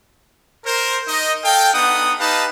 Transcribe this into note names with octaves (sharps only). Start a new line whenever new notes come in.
A#4 C5
D#4 D#5
A4 F5 G5
B3 D4 D#4 F#5 D#6
D#4 G4 B4 F5 A5